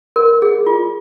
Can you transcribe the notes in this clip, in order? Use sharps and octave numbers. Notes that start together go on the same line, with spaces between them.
A#4
G#4
F4